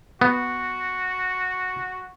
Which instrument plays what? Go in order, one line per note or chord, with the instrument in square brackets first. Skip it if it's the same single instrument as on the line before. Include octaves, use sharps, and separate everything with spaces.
[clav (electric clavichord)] B3 [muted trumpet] F#4